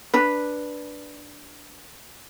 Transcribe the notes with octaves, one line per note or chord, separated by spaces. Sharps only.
D4 B4